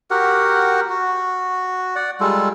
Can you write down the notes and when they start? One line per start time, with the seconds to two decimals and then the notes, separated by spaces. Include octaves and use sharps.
0.11 F#4 G4 A#4 F#5
0.90 F#4
1.96 D5 F#5
2.20 G3 G#3 F4 A4